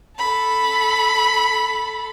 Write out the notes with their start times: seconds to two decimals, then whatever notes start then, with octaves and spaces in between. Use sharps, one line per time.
0.18 A4 B5